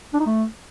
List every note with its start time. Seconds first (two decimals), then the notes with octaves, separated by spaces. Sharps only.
0.14 D4
0.20 D#4
0.26 A3